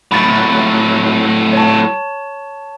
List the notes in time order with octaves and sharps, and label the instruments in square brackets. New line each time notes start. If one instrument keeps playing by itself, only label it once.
[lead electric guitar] A2 F#3 [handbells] B5 A6
[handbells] C#5 A5